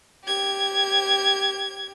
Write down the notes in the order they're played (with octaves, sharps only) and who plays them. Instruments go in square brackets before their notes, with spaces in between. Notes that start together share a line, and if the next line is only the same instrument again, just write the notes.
[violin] G4 G#6